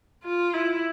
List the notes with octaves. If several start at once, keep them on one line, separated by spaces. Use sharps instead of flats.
F4
E4